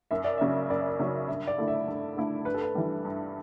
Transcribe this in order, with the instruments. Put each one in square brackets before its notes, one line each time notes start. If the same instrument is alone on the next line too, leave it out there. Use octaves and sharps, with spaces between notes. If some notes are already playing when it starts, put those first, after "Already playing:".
[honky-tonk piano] F#2 [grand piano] E5
[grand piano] D5
[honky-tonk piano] C#3 F#3 C#4 [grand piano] E5
[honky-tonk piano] F#2 [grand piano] D5
[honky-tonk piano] C#3 F#3 C#4
[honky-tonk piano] G2 [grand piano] E5
[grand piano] D5
[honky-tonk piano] D3 A3 E4
[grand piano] E5
[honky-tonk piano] G2
D3 A3 E4
[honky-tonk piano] G2 [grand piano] B4
[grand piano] A4
B4
[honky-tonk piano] E3 G3
G2